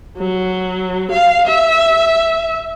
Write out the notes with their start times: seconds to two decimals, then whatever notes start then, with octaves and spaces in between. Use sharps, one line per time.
0.17 F#3
1.12 F5
1.46 E5